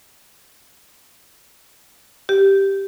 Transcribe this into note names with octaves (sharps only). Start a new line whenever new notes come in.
G4